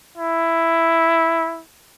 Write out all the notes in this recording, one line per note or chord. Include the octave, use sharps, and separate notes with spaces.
E4